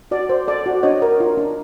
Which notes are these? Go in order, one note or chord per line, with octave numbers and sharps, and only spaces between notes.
F#4 D5
C5
A4 D5
F#4
D4 C#5 D#5
A#4
F4
D4